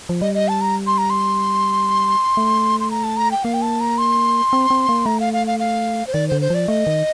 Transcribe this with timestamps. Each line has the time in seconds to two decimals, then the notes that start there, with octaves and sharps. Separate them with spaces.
0.09 F3
0.21 G3 D#5
0.35 D#5
0.48 A5
0.61 A#5
0.87 C6
0.98 A#5
1.10 C6
2.37 A3
2.80 C6
2.91 A#5
3.04 A5
3.17 A#5
3.31 G5
3.44 A#3 F5
3.54 G5
3.62 A5
3.81 A#5
3.98 C6
4.53 C4
4.70 C4
4.89 A#3
5.06 A3 A#5
5.20 F5
5.33 F5
5.47 F5
5.60 F5
6.07 C5
6.14 D#3 D5
6.28 D3 C5
6.41 C5
6.50 F3 D5
6.68 A3 D#5
6.87 D#3